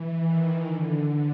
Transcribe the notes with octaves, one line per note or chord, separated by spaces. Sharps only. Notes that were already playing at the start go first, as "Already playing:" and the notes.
Already playing: E3
D#3
D3